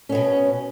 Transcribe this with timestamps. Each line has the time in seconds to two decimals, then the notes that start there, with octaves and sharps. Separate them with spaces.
0.09 C#4
0.12 B3
0.15 B2